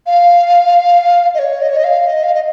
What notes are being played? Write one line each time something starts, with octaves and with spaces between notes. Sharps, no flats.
F5
D#5
C#5
D#5
C#5
D#5
F5
D#5
F5
D#5